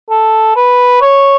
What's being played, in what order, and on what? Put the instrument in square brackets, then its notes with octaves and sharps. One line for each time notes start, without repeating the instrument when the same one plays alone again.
[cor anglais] A4
B4
C#5